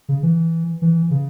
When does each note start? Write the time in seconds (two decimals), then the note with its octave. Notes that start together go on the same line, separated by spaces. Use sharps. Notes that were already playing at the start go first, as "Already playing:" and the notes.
0.09 C#3
0.23 E3
0.82 E3
1.11 C#3